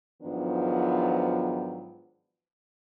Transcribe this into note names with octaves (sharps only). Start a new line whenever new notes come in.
G#2 D#3 F3 F#3 B3 D4